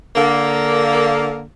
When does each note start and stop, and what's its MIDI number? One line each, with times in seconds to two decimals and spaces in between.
0.16 1.44 50
0.16 1.44 58